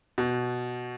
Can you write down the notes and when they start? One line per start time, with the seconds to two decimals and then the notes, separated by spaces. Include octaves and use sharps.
0.18 B2